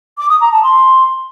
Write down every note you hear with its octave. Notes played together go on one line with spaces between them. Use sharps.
D6
D#6
A#5
A5
C6